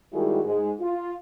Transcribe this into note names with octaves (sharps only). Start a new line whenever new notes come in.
D#3 G3 G#3 E4 F#4 G#4
G#2 G#3
F4